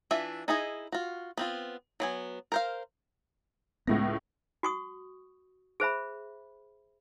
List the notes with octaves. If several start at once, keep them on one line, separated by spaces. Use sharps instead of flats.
E3 D4 F4 E5
D#4 E4 G#4 D#5
F4 F#4
B3 C4 F4
F#3 B3 G#5
A#4 C5 F5
C#2 A2 G#3 B3 A#6
F#4 C#6 D#6
G#4 C5 E5 B5